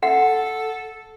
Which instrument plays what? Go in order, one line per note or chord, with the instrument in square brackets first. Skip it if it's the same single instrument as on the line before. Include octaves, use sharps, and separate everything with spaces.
[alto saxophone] A4 [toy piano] F#5